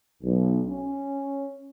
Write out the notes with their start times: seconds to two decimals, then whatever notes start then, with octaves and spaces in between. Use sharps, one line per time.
0.22 B1
0.66 C#4